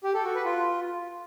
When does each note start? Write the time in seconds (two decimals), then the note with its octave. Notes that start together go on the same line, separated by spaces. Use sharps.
0.04 G4
0.14 A4
0.25 F#4
0.35 B4
0.45 F4